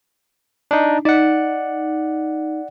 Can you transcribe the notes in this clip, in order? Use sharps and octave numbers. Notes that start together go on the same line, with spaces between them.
D4 D#4
D#4 D5 F#5